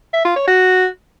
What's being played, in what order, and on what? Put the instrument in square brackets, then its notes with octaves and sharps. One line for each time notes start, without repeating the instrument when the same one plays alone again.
[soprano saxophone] E5
F4
C#5
F#4